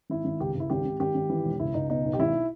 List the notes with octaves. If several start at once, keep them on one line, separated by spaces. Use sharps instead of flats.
G#1 E4
G#1
C#2 G4
C#2 E4
G#1 G4
G#1
G#1 G4
G#1
E3
E1
C#2 E4
C#2 D#4
B2 D#4
B1
G4
G#1 E4